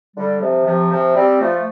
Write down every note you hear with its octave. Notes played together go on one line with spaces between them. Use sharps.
D3 G3
C3 F3
C3 F3
C3 F3
G3 C4
F3 A3